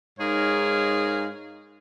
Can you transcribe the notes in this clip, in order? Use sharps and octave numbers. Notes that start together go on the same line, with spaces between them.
G#2 D#4 G#4 A#4 C#5 F5